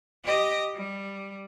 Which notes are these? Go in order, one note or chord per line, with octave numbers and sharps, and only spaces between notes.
G4 D#5
G3